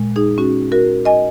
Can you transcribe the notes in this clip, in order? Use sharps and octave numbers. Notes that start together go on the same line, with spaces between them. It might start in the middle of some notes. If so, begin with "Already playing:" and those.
Already playing: A#2 G#3
D#4 G#4
C#4 F#4
F#4 A#4
D#5 G#5